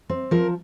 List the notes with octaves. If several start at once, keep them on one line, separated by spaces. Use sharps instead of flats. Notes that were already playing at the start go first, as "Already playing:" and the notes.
C4
F3 A#4